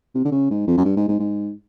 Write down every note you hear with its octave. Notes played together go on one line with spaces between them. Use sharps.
C3
D3
C#3
G#2
F2
F#2
G2
G#2
G#2
G#2